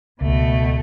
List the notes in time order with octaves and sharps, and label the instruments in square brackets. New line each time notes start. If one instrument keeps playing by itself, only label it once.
[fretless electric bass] C#2 [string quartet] B2 A3